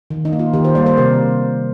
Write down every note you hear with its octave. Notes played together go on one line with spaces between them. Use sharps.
D#3
D#4
A#3
F4
D#3 G4
C5
G3 A#3 D5
C5
C3 A#4